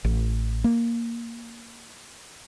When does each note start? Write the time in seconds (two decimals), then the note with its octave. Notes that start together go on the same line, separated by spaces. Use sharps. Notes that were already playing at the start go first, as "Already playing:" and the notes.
0.04 A1
0.64 A#3